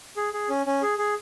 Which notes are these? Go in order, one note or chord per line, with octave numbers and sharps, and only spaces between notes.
G#4
G#4
C#4
C#4
G#4
G#4